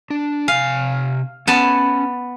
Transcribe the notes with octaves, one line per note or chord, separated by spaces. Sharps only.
D4
C3 F5 G#5
B3 C#4 A5